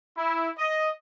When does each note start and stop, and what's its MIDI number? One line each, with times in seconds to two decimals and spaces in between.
0.17 0.48 64
0.58 0.90 75